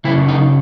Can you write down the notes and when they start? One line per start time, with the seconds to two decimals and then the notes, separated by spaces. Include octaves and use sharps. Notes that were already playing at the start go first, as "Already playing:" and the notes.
0.04 C#3 F#3 C#4 E4
0.28 D#4